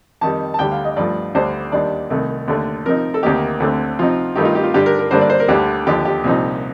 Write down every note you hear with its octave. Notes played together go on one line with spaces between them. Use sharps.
F2 D#3 G3 A5
A5
D2 D3 G3 G5
F5
D#5
G2 F3 A3 D5
D2 D3 G3 D4 C5
D#2 D#3 G3 D4 D5
C2 C3 D#3 A3
D#2 D3 A3
C3 F3 C4 D#4 A#4
A4
D2 C3 D#3 A#3 G4
D2 D3 A3 C4
C3 F3 C4 D#4 F4
G2 D#3 A3 D#4 G4
F4
G4
F4
G2 D3 G3 D4 G4
A#4
A#4
G2 D3 G3 A#3 D4 C5
D5
C5
A#4
D2 D3 G3 G4
D#2 D3 F3 G4
G4
C2 A#2 F3 C4 D#4